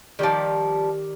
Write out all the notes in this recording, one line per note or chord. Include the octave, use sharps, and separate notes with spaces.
D#3 F3 G3 G4 D5